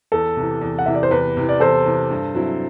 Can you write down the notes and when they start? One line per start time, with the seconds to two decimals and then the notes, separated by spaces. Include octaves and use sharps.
0.12 E2 A4
0.36 C3 E3
0.61 E2
0.79 F#5
0.86 C3 E3 E5
0.95 D5
1.03 C5
1.11 E2 B4
1.37 C3 E3
1.49 D5
1.60 E2 A4 C5
1.85 C3 E3
2.11 G2
2.35 F#3 C4 E4